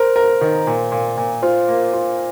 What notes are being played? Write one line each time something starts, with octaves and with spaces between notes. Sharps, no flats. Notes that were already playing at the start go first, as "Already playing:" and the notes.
Already playing: A#4 C5
A#4
D#3
A#2
A#2
A#2
F4 C5
A#3
F4